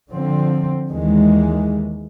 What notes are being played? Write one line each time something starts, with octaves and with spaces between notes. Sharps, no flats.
D3 F3 C4
D#2 D#3 E3 G#3